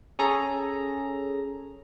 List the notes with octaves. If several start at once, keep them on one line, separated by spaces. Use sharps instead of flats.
C#4 G#4 A4 A#5